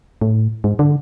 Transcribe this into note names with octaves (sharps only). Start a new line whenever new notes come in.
A2
G#2
D3